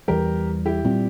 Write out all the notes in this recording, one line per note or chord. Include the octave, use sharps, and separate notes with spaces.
E2 E3 G3 G4 A#4
E4 G4
A#2 G3 C4